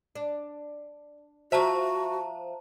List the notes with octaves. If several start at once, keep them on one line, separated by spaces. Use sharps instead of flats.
D4
F3 F#4 C5 E5 A5 A#5